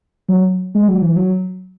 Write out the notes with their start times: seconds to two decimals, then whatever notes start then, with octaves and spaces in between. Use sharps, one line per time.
0.29 F#3
0.75 G#3
0.88 F#3
1.02 E3
1.16 F#3